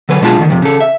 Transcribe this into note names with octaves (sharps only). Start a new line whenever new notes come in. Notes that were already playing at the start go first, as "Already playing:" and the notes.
D3 F#3 B4
B2 G#3 D4 F4 A5
D2 A2 D#3
F2 C3
C#3 A4
E5